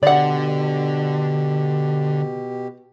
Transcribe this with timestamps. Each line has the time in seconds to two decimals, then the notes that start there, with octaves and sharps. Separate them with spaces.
0.03 B2 D3 G4 D5 F#5